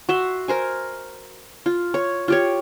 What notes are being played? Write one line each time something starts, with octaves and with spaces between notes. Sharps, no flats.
F#4 E5 C6
A#4 C5 G#5
F4
C#5
F4 G4 C#5